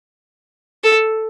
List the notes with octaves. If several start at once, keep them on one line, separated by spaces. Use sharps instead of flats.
A4